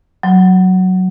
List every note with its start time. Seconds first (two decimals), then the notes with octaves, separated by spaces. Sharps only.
0.23 F#3